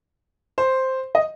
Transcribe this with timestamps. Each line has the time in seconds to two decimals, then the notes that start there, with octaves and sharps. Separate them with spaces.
0.58 C5
1.15 D#5